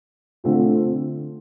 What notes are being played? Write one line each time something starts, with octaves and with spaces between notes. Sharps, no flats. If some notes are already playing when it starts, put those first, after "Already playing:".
D3 A3 C4 F4